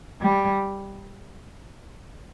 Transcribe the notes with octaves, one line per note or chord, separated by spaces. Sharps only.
G3